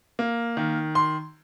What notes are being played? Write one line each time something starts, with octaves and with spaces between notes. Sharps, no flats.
A#3
D#3
C6